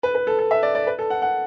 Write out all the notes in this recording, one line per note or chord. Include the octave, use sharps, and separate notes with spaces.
B4
B4
A4
A4
E5
D5
D5
B4
A4
F#5
F#5